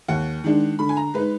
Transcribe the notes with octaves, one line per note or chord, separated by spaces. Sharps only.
D#2 F#5
D#3 G#3 D4
D3 B5
G#5
A#5
G#3 D#4 B4